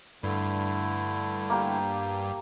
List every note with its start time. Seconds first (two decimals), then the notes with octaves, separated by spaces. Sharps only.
0.23 G2 D3 A3 E4
1.50 A#3 G4